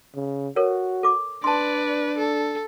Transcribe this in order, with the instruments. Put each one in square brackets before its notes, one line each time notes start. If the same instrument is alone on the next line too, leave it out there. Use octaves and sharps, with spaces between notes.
[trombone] C#3
[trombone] F#4 [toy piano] A4 A#4 C#5
[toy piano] A4 D6
[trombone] D4 [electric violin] B4 D5 [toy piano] A5 C6
[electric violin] A4